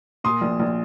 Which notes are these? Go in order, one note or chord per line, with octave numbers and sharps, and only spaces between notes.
A#2 C6 D#6
A#1
A#1